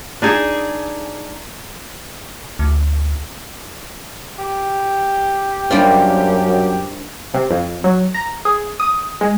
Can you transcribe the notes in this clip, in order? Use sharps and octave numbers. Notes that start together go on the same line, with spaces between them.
D4 D#4 G#4
D2
G4
F#2 G3 A#3 D4 F4 C5
C3
F2
F#3
A#5
G#4
D#6
G#3